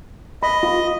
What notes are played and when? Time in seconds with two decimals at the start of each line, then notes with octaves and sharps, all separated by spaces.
0.43 D#5 B5
0.63 F4